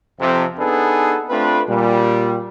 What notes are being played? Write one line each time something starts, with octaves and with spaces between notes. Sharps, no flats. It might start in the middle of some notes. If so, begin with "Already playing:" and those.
F2 C3
B3 D4 D#4 G#4 A4 B4
A3 C4 D4 F4 B4
A#2 G3